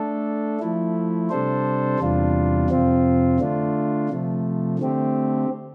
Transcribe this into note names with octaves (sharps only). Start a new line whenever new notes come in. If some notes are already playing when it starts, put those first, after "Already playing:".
Already playing: A3 D4 A4
F3 A3 E4
C3 G3 D4 A4 C5
E2 C3 G3 D4 F4
F2 C3 F3 C4 F4
D3 A3 D4 F4
C3 F3 A3
D3 A3 C4 G4